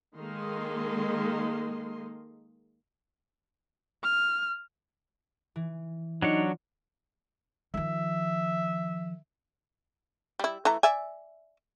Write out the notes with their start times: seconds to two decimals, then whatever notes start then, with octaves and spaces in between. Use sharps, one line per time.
0.16 D#3 G#3 A#3 A4 D#5 C6
4.03 F6
5.56 E3
6.22 F#3 D4 D#4 F4 C#5
7.74 D#3 F3 E5
10.39 G3 E4
10.65 E3 A3 A#5
10.83 D5 E5 G#5